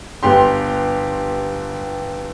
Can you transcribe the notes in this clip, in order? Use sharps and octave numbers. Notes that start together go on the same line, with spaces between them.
G1 B3 G4 C6